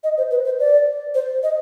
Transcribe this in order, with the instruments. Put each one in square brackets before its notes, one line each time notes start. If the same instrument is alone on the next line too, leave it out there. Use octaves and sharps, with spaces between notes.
[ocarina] D#5
C5
B4
C5
D5
C5
D#5